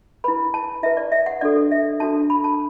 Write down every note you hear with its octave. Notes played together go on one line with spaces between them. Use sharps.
E4 B4 B5
A5
E4 B4 E5
D5
E5
F#5
D4 F#4 A4 D5
E5
D4 F#4 A4 A5
B5
A5